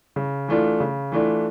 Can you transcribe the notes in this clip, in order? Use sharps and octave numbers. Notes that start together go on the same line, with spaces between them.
C#3
E3 A3 D4 F4
C#3
E3 A3 D4 F4